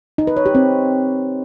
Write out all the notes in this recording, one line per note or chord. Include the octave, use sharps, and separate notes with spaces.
D#4
B4
C#5
G4
C4